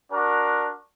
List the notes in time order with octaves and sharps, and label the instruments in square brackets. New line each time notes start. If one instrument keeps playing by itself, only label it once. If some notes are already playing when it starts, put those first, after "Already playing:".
[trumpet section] D4 F#4 A#4